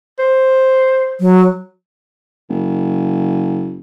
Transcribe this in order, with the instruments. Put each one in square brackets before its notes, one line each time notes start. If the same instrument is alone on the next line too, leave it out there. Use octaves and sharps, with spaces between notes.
[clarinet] C5
[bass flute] F#3
[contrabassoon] F#1